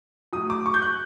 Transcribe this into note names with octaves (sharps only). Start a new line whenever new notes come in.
A2 F#3 D#6
D6
C#6
G6
F#6